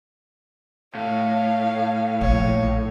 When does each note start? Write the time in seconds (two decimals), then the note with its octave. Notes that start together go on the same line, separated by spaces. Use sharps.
0.95 A2 C#5 F5
2.21 A#1 C#5